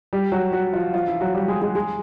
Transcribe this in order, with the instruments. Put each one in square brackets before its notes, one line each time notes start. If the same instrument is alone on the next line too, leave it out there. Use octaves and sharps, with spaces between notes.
[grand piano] G3 G4
F#3 F#4
F#3 F#4
F3 F4
F3 F4
E3 E4
F#3 F#4
G3 G4
G#3 G#4
G#3 G#4
G#3 G#4